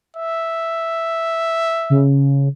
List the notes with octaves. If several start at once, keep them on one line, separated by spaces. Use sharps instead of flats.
E5
C#3